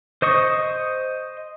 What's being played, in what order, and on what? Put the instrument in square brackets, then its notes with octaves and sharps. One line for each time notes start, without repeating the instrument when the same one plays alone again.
[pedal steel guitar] C5 D#5 C#6 D#6